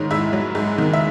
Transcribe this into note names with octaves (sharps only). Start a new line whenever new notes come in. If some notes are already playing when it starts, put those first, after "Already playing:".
Already playing: G#2 D#3 C#5
G#2 E4 E5
F#3
G#2
D#3
E5